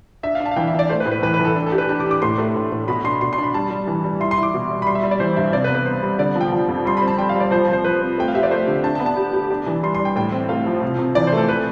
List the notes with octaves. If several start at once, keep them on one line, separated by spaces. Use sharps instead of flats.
D4 E5
F5
D4
A5
F5
E3 G5
E5
E3
D5
A3 C5
B4
A2
B4
E3 B4
B4
E3
A4
D4
A4
G4
B4
D4 A5
D6
D4
D6
A2 C6
A3
A2
A2
B2 B5
D4 C6
B2 C6
C6
D4
B5
G3 A5
G3
E3
G3
E4 C6
C6
E4
D6
B2
G3
B5
G3 C6
E5
G3
D5
E3 C5
G2 E5
C3 D5
B4
B3
B4
B3 C5
G3
D3 D5
F3
G5
F3
F2
G3 C6
C4 B5
A5
G3 G5
F5
G3
D5
F3 C5
F3
C5
F3 B4
C4
A3 G5
F5
G4 E5
D5
A3 C5
D3
D4 A5
A5
B3
A5
G4
G4
D4
E3
G3 C6
C6
G3
G5
A2 G5
C4
A3 F5
F3
C3
C3
E3 D5
C5
A3
A4
B4